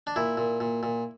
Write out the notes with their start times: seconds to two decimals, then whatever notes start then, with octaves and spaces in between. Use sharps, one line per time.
0.07 D4
0.16 A#2 E4
0.37 A#2
0.60 A#2
0.83 A#2